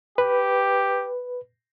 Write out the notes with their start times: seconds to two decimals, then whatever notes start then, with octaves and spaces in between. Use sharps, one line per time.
0.18 G4 B4